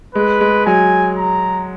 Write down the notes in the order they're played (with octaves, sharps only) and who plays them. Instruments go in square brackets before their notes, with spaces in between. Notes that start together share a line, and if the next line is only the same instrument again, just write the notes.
[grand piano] G#3 [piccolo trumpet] B4
[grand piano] G#3
[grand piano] F#3 [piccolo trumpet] G#5
[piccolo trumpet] A#5